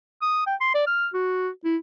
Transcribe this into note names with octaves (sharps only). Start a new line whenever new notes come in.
D#6
G5
C6
D5
F6
F#4
E4